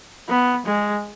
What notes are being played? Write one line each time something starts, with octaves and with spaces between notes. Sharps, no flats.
B3
G#3